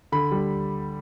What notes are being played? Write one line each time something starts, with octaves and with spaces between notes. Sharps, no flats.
D3 B5
G3